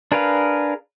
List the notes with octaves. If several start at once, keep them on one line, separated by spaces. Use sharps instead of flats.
D4 G#4 A#4 B4 F5